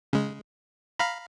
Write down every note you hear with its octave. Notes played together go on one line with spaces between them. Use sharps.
C#3 G#3
F5 A#5 B5